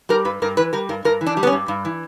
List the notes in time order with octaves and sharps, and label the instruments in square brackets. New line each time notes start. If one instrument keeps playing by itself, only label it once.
[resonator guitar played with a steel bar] G3 A#4
G2 B4
G2 A#4
E3 B4
G3 A#4
G2 A#4
G2 A#4
E3
D4
G3
B3
C#4
G2
G2
E3